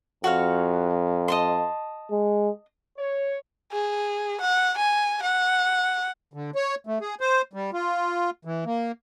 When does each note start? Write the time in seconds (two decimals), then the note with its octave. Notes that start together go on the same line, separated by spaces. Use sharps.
0.24 F2 F#4 C#5 F5
1.28 D#5 A5 C6
2.11 G#3
2.97 C#5
3.72 G#4
4.41 F#5
4.78 G#5
5.23 F#5
6.34 D3
6.55 C#5
6.87 A3
7.01 G#4
7.21 C5
7.53 G3
7.73 F4
8.45 E3
8.65 A#3